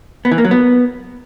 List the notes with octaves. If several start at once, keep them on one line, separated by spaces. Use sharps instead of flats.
B3
E3
A#3
F#3
B3